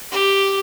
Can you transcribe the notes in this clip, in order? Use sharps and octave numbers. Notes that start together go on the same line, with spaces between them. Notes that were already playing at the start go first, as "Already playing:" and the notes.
G4